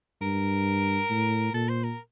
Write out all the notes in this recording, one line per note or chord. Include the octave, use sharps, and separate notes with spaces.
G2 A#4
A2
A#2 A4
C5
A#4